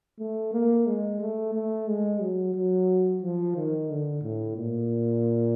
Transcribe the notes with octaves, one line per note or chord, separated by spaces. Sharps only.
A3
A#3
G#3
A3
A3
G#3
F#3
F#3
F3
D#3
D3
A2
A#2